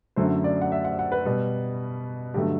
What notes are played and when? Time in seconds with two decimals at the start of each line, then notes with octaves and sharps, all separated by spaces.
0.16 F#2 D3 F#3 A3 C5
0.44 D5
0.62 F#5
0.72 E5
0.85 F#5
0.99 F#5
1.12 B4
1.25 B2 G3
2.34 G2 D3 F#3 A3 G4